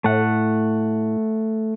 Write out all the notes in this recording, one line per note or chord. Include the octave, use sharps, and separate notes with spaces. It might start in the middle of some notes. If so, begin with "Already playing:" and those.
A2 A3 F#5